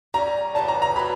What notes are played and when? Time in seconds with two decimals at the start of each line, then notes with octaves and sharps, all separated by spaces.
0.14 G3 A#3 C#4 A#5
0.55 C#3 E3 G3 B3 A5
0.68 A#5
0.82 A#5
0.96 B2 F#3 B3 B5